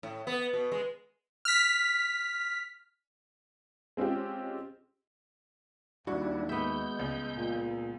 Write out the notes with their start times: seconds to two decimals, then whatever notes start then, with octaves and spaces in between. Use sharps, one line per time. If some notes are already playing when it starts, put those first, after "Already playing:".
0.03 A2
0.27 B3
0.53 B2
0.72 G#3
1.45 F6 B6
3.97 G#3 C4 C#4 F4 G4
6.07 D#2 G3 D4 E4 F#4
6.49 G#3 B3 E5 G6
6.99 C#2
7.37 A#2